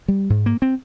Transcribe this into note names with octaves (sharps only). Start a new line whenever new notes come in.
G3
G#2
A#3
C4